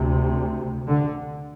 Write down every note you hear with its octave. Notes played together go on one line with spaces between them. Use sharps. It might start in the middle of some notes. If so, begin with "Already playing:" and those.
Already playing: D2 C3
D3